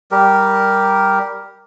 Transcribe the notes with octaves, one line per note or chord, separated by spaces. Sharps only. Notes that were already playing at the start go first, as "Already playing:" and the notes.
G3 G4 A#4